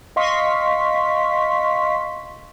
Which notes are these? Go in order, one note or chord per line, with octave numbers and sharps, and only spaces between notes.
D#5 F5 C6 C#6 B6